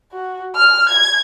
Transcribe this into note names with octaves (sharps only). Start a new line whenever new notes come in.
F#4
F6
G#6